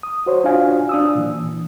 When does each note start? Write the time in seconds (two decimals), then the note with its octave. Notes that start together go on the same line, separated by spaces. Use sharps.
0.03 D#6
0.26 F#4 C5 C#5
0.44 D4 F4 F#4 F5 G#5
0.89 D4 D#6 E6
1.15 A#2 E3